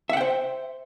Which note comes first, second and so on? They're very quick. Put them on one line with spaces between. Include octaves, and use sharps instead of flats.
E5 F#5 G5 C5